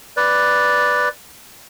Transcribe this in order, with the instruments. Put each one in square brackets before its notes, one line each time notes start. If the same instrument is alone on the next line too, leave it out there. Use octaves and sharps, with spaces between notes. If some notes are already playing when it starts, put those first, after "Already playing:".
[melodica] B4 D5